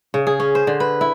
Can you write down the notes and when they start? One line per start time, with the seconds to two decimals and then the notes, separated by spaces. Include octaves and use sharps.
0.14 C#3
0.27 G#4
0.40 C#4
0.55 C5
0.67 D3
0.80 B4
1.01 E4